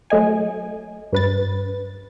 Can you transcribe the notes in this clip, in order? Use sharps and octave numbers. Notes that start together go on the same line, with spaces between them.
F#3 A3 D#5 G#5
G2 B4 A6